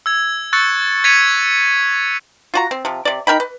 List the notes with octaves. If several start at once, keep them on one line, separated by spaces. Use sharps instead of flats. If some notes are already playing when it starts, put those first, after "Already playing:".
E6 G#6
C#6 E6 F#6 A6 C#7
G#6 A6 B6 C#7 D#7 F7
F4 F#4 A#5
C4
C3 F3
C3 D5
D#4 A#4 G5 B5
B4